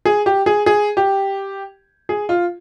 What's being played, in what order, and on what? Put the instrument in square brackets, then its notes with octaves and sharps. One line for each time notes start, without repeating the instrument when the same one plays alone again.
[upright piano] G#4
G4
G#4
G#4
G4
G#4
F4